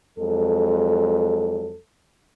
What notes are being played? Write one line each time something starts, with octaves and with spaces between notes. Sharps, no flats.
F2 F#3 G#3 A4